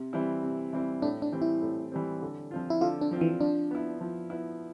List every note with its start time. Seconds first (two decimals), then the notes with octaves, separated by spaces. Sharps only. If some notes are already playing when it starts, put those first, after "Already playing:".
Already playing: C3
0.13 E3 G3 C4 E4
0.42 C3
0.73 E3 G3 C4 E4
1.02 A2 D4
1.22 D4
1.32 E3 G3 C4
1.42 E4
1.62 A2
1.92 E3 G3 C4
2.22 D3
2.51 F3 C4 F4
2.70 E4
2.81 D3 F4
3.01 D4
3.11 F3 C4 F4
3.21 E3
3.41 F3 D4
3.71 B3 E4
4.01 F3
4.30 B3 E4